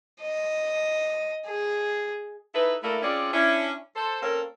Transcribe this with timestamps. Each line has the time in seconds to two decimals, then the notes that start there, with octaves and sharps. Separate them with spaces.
0.21 D#5
1.47 G#4
2.54 D#4 E4 A4 B4
2.83 A3 A#3 D4 E4 A4 A#4
3.02 C4 C#4 F4 G#4 D5
3.33 C#4 D4 E4
3.96 A4 C5
4.22 A#3 C4 C#4 A4 A#4